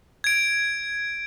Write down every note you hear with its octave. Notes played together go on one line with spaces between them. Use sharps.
G#6 D7